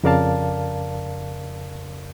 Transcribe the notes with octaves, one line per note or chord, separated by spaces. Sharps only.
F2 C#3 A#4 D5 F5 A5